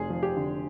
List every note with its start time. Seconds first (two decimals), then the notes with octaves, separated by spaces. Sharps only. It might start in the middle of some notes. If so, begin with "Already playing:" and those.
Already playing: F1 G#4
0.10 F3
0.23 G4
0.37 D3